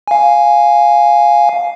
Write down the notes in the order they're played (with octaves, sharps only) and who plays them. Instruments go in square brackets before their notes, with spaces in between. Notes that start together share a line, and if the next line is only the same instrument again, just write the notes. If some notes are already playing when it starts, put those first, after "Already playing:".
[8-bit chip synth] F5 G#5